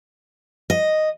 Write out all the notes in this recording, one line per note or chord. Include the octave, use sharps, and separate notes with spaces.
D#5